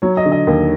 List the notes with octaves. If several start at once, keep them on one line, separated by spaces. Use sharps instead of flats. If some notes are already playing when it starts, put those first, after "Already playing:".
F#3 C#5
D#5
D3
D#5
D#2